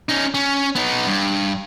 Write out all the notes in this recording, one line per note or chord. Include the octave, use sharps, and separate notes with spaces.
C#4 D#4
C#4
B3 D#4
G2